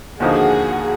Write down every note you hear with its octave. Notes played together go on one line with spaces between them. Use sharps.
D#2 D3 F3 A#3 D#4 F#4 G#4